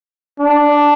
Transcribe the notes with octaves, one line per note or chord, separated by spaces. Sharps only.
D4